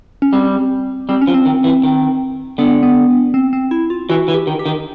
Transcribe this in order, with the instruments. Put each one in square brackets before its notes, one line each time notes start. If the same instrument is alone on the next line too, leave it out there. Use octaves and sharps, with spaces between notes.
[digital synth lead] C#4
[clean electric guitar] G3 [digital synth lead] C4
[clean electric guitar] G3 [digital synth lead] C4
[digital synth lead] C#4
[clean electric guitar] F3
[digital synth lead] C4
[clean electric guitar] D#3
E3
D#3
[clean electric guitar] D3 [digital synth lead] B3
[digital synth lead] B3
C4
C4
E4
F4
[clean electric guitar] E3 [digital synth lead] F#4
[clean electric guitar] E3
[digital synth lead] G4
[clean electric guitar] D#3
[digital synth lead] G4
[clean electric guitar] D#3